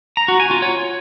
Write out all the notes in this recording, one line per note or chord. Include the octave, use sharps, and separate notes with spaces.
A#5
F#4
G#5
F4
C#5